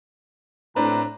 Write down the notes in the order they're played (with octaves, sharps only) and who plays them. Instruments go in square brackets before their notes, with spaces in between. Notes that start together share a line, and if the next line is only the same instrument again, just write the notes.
[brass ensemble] A2 A#5 [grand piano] C4 D4 B4